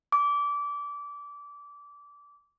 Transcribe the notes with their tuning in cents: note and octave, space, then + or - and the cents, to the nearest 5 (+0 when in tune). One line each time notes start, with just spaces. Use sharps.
D6 -20